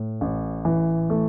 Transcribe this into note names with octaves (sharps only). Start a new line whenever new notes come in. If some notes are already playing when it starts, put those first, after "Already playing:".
Already playing: A2
A1
E3
A3